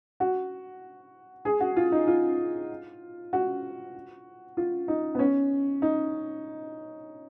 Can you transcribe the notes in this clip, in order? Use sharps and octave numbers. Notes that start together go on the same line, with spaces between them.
F#4
G#4
F#4
F4
D#4
F4
F#4
F4
D#4
B3
C#4
D#4